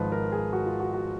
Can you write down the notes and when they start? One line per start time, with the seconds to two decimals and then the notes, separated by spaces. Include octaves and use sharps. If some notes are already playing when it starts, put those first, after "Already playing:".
Already playing: G#1 G#2 F3 B4
0.12 A#4
0.32 G#4
0.53 F#4
0.66 F4
0.80 F#4
0.94 F#4